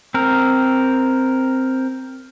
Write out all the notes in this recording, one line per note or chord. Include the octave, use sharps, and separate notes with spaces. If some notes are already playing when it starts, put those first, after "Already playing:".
C4 A#4